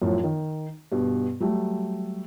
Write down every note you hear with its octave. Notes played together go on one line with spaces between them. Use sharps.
F#2 A2 F3
D#3
G2 B2
F#3 G3 A3